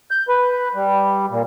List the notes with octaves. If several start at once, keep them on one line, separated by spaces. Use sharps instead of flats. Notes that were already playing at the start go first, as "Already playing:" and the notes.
G6
B4
G3
A#2